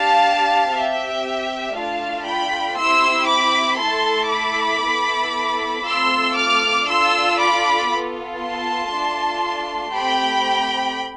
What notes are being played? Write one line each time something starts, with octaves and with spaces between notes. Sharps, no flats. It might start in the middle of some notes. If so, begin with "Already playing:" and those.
Already playing: D4 G4 F5 A5
C4 G4 E5 G5
A3 D4 F4 F5 A5
G5 B5
C4 E4 G4 C6 E6
B5 D6
A3 E4 A4 A5 C6
B5 D6
B3 E4 A4
A3 C4 F4 A4 C6 E6
D6 F6
D4 F4 A4 C6 E6
B5 D6
B3 F4 A4
A5 C6
A3 D4 F4
A3 C4 G4 G5 B5